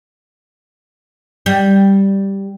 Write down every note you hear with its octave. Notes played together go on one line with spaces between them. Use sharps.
G3